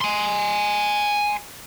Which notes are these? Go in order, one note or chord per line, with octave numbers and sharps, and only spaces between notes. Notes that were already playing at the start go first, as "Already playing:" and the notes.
G#5 C6